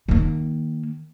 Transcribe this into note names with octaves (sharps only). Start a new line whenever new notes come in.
D#3 A#3